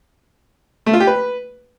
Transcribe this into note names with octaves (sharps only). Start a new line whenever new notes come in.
A3
F4
G4
B4